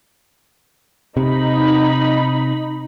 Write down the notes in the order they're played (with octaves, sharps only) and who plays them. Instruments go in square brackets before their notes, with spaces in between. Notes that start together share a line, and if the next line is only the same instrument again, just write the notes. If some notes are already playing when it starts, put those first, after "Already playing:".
[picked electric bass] C3 [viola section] D#4 B5